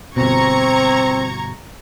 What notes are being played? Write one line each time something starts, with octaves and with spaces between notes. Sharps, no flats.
G1 B2 C4 A#5 C#6 G#6